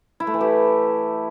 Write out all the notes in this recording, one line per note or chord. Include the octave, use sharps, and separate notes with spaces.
E4
A3
E3
G4